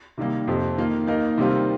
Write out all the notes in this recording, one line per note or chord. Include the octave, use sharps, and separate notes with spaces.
C3 D#3 G3 A#3
F2 C3 F3 C4
D#3 A#3 F4
D#2 D#3 A#3 D#4 A#4
C3 D#3 G3 C4 F4